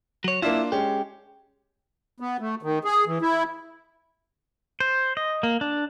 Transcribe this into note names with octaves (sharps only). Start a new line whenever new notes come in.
F#3 C#5
A#3 D4 E4 F4 E5
G#3 C#4 G4
B3
A3
D#3
G#4
E3
E4
C5
D#5
A#3
D4